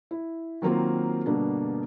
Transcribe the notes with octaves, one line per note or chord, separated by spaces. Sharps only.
E4
D#3 F#3 A#3 C4 F4
G2 B2 D3 A#3 D4